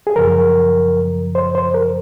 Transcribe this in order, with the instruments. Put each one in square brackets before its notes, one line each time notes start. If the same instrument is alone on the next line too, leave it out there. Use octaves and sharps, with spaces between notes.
[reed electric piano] G#4
F#2 C#3 F3 A#4
C5
C5
A#4